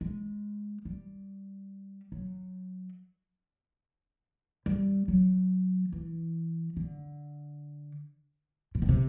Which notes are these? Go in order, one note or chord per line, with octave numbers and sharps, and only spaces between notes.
G#3
G3
F#3
G3
F#3
E3
D3
A#2
B2
C3